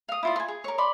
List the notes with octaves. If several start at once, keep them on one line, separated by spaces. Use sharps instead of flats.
F5 D#6
E4 F4 D5
G#5 C6
G#4
A#4 C#5
D5 B5 C6